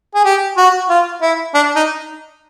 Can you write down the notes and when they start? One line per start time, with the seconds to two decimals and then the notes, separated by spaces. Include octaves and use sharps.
0.15 G#4
0.25 G4
0.57 F#4
0.90 F4
1.22 E4
1.54 D4
1.76 D#4